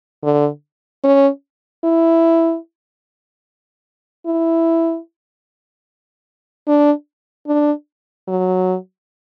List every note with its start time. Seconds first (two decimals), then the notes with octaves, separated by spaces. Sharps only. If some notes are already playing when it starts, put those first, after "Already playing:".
0.24 D3
1.04 C#4
1.84 E4
4.26 E4
6.67 D4
7.47 D4
8.28 F#3